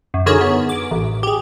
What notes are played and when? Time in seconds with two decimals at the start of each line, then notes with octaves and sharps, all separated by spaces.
0.14 F#2
0.26 D3 D#3 F#4 G#4 A#4 C#5
0.41 B3
0.69 D6
0.91 A1
1.23 G4 G#4